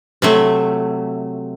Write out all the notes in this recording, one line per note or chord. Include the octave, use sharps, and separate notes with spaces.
C3 F#3 A3